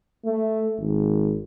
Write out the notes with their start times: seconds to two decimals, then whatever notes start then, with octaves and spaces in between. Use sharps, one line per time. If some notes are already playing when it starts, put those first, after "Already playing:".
0.25 A3
0.78 G#1